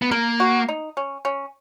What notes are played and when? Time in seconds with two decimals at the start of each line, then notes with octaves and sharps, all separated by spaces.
0.02 B3
0.11 A#3 A#4
0.40 F#4
0.68 D#4
0.97 C#4
1.25 C#4